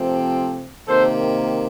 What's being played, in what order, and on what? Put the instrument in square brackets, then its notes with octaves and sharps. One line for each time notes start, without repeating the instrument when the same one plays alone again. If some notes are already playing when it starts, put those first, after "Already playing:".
Already playing: [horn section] C3 F3 A3 C4
C3 D#3 A#3 A4 C5